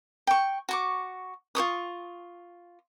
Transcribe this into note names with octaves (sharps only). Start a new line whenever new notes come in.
G5 C#6
F#4 C#6 D6
F4 C#5 C#6 D#6